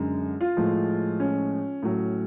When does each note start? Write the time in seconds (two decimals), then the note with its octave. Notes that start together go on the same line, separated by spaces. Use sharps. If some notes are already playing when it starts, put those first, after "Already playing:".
Already playing: F#2 D3 G#3
0.41 F4
0.57 A2 F3 G#3
1.20 C#4
1.83 A2 F#3